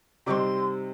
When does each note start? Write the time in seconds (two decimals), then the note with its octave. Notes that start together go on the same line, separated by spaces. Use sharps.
0.26 C3 G3 C4 D#4 C6 D6